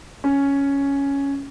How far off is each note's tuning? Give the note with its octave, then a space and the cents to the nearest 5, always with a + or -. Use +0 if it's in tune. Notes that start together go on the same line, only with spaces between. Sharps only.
C#4 +5